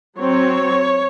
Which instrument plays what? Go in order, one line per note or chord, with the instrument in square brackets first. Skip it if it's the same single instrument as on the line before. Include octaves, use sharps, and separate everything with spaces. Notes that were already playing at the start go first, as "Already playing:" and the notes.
[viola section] F#3 C4 C#5